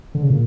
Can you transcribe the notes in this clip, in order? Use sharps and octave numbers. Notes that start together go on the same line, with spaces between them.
D3
C#3
A#2